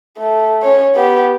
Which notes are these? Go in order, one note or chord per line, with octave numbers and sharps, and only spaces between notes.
A3
C#4 C#5
B3 G4